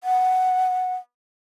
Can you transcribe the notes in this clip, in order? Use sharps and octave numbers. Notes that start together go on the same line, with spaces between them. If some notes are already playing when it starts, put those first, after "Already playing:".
F#5